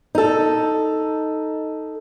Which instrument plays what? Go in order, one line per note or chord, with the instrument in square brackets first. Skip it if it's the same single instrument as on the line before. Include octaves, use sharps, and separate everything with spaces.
[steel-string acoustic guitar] D#4 A4